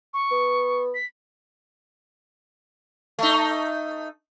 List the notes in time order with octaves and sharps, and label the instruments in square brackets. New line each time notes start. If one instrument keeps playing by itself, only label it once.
[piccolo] C#6
[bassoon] B3
[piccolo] B6
[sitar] A3 D#4